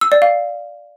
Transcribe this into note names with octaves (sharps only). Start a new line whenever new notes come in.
E6
D5
F5